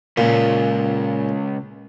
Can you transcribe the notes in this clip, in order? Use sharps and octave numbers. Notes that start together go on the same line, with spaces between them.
C#2 A#2 C#3